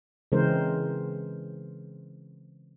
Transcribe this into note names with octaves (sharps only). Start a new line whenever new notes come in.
C#3 E3 G#3 C4 A#4 C5